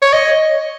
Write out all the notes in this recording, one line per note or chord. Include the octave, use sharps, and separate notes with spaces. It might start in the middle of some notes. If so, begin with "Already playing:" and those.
C#5
D#5